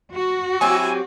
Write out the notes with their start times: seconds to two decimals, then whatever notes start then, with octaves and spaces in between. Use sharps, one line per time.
0.12 F#4
0.61 F#3 C4 E4 G4 E5 G#5